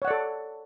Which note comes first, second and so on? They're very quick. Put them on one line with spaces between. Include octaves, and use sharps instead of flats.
C#5 F#5 D5 A4